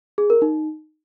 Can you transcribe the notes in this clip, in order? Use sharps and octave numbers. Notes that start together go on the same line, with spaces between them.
G#4
A#4
D#4